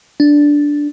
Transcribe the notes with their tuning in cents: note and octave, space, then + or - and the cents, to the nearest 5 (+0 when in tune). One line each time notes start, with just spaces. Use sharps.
D4 -5